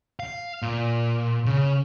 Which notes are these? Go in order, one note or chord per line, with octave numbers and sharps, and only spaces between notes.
F5
A#2
C#3